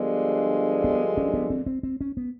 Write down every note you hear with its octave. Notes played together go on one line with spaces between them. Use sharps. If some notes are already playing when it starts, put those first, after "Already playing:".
Already playing: G2 D3 F3 G#3 B3
B3
C#4
B3
C4
C4
C4
C#4
B3